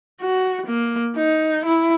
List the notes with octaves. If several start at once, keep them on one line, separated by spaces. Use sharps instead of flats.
F#4
A#3
D#4
E4